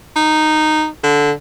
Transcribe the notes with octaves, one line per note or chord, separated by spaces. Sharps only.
D#4
D3